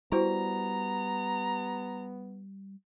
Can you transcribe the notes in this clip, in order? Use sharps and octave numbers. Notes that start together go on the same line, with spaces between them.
G3 B3 E4 F#4 C5 A#5